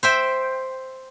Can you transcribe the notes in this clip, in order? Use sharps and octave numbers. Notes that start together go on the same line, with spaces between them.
C5 E5 G5